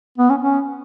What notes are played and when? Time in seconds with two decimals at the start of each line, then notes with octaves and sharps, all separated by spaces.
0.18 B3
0.30 C#4
0.43 C#4